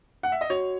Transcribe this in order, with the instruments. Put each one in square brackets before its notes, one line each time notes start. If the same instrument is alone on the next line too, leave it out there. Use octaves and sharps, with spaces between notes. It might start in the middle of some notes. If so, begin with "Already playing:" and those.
[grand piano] F#5
E5
D#5
[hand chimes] F#4 [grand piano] C#5